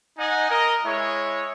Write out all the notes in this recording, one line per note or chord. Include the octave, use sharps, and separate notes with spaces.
D#4 D#5 F#5 G#5
A#4 D#5
G#3 E4 C#5